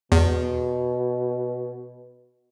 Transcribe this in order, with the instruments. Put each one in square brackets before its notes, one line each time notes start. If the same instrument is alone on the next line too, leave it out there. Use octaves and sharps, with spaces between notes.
[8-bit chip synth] E2 [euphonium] B2